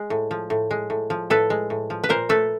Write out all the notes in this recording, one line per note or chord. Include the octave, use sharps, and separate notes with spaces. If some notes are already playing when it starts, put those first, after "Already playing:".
Already playing: G#3
A2
F3
A2
G#3
A2
F3
A2 A4 B4
G#3
A2
F3
B4
A#2 A#4 C5
A3 A4 B4